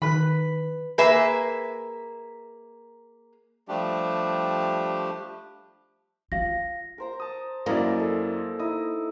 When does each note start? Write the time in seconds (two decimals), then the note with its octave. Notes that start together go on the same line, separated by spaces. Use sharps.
0.02 D#3 B4 B5
0.98 A#3 G#4 B4 E5
3.68 F3 G3 A3 D4 G4
6.32 F4 F5 A#6
6.98 A#4 C5 A#5
7.20 A5 D#6
7.66 F#2 A#3 E4 A#4 D5 D#5
8.00 A4
8.60 D#4 E4 D#5 D#6